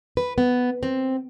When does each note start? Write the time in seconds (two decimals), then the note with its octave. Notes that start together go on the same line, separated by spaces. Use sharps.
0.17 B4
0.38 B3
0.83 C4